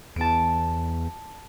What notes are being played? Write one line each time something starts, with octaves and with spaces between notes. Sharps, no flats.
E2 A5 D7